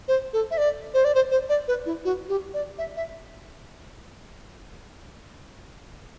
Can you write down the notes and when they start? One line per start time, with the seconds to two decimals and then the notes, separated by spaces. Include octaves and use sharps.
0.08 C5
0.33 A4
0.51 E5
0.58 D5
0.94 C5
1.05 D5
1.15 C5
1.31 C5
1.49 D5
1.68 B4
1.86 E4
2.05 F#4
2.29 G4
2.54 D5
2.78 E5
2.96 E5